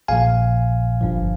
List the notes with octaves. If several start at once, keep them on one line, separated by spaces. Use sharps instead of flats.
A#1 A#2 F3 F5 G#5
G1 G2 F3